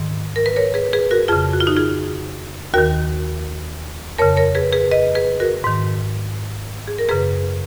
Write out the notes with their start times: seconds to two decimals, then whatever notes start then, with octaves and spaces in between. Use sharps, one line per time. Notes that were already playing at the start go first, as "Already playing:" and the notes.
Already playing: G#2 D#3
0.36 A#4
0.46 B4
0.56 A#4 C#5
0.74 G#4 B4
0.93 G#4 B4
1.11 F#4 A#4
1.28 F2 C#3 F4 G#4
1.53 F#4
1.60 F4
1.67 D#4 F#4
1.77 F4 G#4
2.74 D#2 D#3 F#4 A#4
4.18 F2 C#3 A#4 C#5
4.37 A#4 C#5
4.55 G#4 B4
4.73 G#4 B4
4.91 B4 D#5
5.15 G#4 B4
5.40 F#4 A#4
5.64 G#2 D#3
6.88 G#4
6.99 A#4
7.09 F#2 C#3 G#4 B4